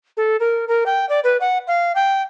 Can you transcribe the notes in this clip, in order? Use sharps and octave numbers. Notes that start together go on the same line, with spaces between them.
A4
A#4
A#4
G5
D5
B4
F#5
F5
G5